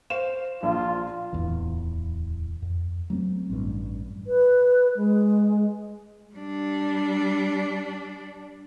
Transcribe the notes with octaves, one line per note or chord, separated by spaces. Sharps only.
C5 F5 E7
A#1 F4
D1 E2 E3
F2
F#3 A3 A#3 C4
A1 G2
B4
G#3
G3 D4